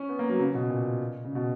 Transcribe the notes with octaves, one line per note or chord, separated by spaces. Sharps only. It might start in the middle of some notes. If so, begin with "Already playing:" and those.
Already playing: C#4
B3
A#3
F#3
C#3
B2
A#2
C#3
B2